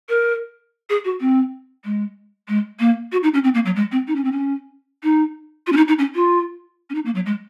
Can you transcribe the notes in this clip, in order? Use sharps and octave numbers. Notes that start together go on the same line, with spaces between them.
A#4
G#4
F#4
C4
G#3
G#3
A#3
F#4
D#4
C#4
C4
A#3
F#3
G#3
C4
D#4
C#4
C4
C#4
D#4
F4
C#4
D#4
D#4
C#4
F4
C#4
D#4
A#3
F#3
G#3